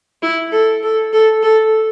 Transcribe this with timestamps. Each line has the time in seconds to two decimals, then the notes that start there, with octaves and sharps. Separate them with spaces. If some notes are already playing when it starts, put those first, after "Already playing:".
0.23 E4
0.52 A4
0.83 A4
1.13 A4
1.43 A4